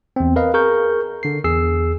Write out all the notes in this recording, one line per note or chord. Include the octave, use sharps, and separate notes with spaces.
E2 C4
A#4 B4 D#5 F5
G#4 A#4 C#6 G6
D3 C7
E2 G#4 E6 C7